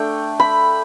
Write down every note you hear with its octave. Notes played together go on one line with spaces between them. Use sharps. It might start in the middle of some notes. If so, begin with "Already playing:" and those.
Already playing: A3 D4 G5
B5